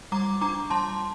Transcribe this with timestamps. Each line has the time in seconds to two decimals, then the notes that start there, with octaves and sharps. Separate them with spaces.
0.12 G3 A#5 D6
0.41 D4 A#5 D6
0.70 G3 A5 C6